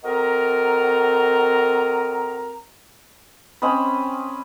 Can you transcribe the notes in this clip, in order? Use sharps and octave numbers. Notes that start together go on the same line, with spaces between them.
C4 F#4 A4 A#4 D#5 A#5
C4 C#4 D#5 B5